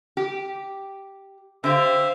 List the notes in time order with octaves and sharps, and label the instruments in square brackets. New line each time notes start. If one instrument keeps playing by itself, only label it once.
[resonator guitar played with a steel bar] G4
[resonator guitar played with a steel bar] D3 G4 [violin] C5 F5 [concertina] E5